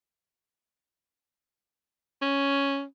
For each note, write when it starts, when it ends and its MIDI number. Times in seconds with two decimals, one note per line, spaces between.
2.22 2.84 61